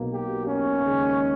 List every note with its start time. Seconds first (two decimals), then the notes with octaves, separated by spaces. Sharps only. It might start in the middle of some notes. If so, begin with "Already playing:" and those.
Already playing: B1 B2 A#3
0.14 G4
0.48 C#4
0.81 D#2 C#3 G#3